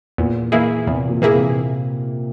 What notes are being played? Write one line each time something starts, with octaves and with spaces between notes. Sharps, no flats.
E2 A#2
E3 A#3 E4 G#4
E2 C3
A#2
E3 A#3 E4 G#4
C3